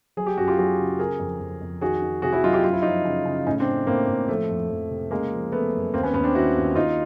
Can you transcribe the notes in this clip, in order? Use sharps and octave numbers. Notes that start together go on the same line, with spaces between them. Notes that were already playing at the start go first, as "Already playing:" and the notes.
F#3 G#4
G4
F#2 F#4
F4 G4
F#3 F#4 G#4
C#3
C#3 G#4 A#4
F2
F2
F2
D#3 F#4 G#4
D#3
C3 F#4 G#4
E4 F#4
F#3 D#4 F4
F4 G4
F#2 F4
E4
F3 D#4 F4
C#3
C#3
A2 C#4 D#4
C4 D4
A2
A2 A#3 C4
A2
F3 A3
F2
F2
C3
C#3 G#3 A#3
F3
F3 A3 B3
F#2
D#2 A#3 C4
B3 C#4
D#2 B3 C#4
C4 D4
D#3 E4 F#4
D#2
D#2 D#4 F4